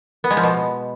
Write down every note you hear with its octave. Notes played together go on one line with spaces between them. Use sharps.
B3
G#3
F3
B2